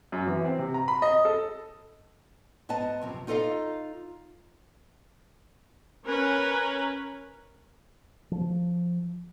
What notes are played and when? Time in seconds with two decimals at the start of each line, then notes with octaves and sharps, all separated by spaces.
0.12 F#2
0.27 E3
0.45 C4
0.59 C3
0.74 A#5
0.88 B5
1.02 D#5
1.25 A4
2.69 G#2 B3 B4 D#5 A5
3.02 F#2 C3 F3
3.27 D#4 F4 A4 C#5 D#5 F5
6.04 C#4 A#4 B4
8.31 F3